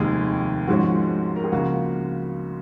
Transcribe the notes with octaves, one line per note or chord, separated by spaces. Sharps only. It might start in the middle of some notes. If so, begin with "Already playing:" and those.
Already playing: F1 D#2 D#3 G#3 G#4
G#2 F3 G#3 C#4 F#4
A#4
G#4
C#2 C#3 F3 A#3 F#4